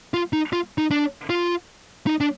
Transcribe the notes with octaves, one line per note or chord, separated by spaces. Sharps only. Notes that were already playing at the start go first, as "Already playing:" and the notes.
F4
D#4
F4
D#4
D4
F4
D#4
D4